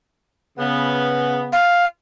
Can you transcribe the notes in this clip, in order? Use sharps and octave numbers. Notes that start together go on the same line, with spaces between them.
C#3 B3
F5